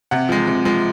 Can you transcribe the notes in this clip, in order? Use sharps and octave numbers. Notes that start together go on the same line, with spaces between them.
C3 F#5
F3 G#3
C3
F3 G#3